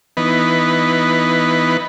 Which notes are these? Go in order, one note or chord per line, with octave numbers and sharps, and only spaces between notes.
E3 B3 D#4 B4